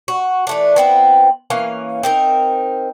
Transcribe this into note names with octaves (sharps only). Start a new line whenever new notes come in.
F#4
E3 A3 D4
B3 C4 E4
E3 A#3 C#4 F5
C4 D#4 A#4